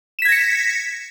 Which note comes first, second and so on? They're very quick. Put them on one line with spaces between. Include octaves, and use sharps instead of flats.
E7 B6 G#6 A#6 C#7